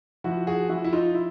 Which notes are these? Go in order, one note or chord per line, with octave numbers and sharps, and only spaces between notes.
F3 E4 F#4
F#4 G#4
F3 E4 F#4
E4
D#4 F4
E4